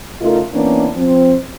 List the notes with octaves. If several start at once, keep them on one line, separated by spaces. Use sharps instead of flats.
C#3 A3 D#4 F4 A4 A#4
E3 A#3 B3 C#4 D4
F3 C4